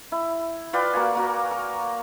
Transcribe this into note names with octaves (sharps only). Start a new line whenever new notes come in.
E4
F4 B4 D5 G5
A#3 F#4 G#5
A#3 F#4 A#5
A#4